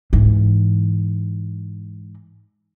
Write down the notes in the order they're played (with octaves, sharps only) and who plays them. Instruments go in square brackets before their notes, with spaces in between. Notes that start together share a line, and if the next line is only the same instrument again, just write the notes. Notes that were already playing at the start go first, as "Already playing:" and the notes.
[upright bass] G#2 E3